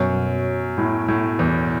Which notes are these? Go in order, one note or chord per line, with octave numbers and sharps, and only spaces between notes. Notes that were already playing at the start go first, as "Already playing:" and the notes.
Already playing: F#2 B2 B3 F#4 C#5
A2
A2
E2